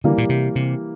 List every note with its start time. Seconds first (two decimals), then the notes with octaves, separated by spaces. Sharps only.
0.04 D3 E3 G3 A#3
0.18 A#2
0.29 C3
0.56 C3